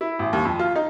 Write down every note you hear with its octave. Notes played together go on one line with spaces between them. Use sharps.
E4
A1
D#2
F2
F4
D#4